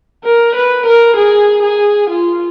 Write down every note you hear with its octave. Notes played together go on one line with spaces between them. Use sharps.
A#4
B4
A#4
G#4
G#4
F4